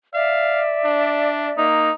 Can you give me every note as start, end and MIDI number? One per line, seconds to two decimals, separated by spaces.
0.14 1.64 74
0.14 1.64 76
0.14 0.62 77
0.85 1.52 62
1.58 1.90 58
1.58 1.91 63